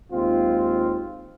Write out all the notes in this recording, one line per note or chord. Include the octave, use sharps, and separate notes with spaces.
D#2 G#3 C4 F4